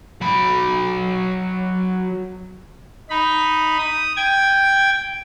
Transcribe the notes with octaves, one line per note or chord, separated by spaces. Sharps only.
F#3 B5
D#4 B5
D#6
G5 G#6